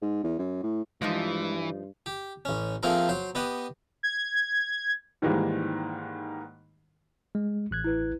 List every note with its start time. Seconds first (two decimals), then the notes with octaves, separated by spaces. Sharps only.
0.02 G#2
0.24 E2
0.39 F#2
0.63 A2
1.02 G2 E3 F3 G#3 D#4 F4
2.06 G4
2.45 A1 C#4
2.83 F3 A3 A#3 C4 G#4 A#4
3.09 F#3 C5
3.35 B3 G4 D#5 F#5
4.03 G#6
5.22 G#2 D#3 E3 G3 G#3 A#3
7.35 G#3
7.71 A1 F#6 G#6
7.84 E4 B4